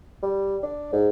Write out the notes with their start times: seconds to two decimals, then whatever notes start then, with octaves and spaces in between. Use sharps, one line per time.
0.23 G3
0.63 D4
0.93 G#2